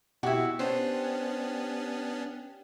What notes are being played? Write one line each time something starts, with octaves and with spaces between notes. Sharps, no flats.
B2 E4 F#4 G4
B3 C#4 D4 C5